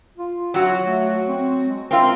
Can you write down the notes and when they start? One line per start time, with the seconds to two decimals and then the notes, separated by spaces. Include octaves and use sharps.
0.17 F4
0.54 F#3 F#4
0.84 A3
1.27 C4
1.68 G#3
1.91 C4 F4 A#4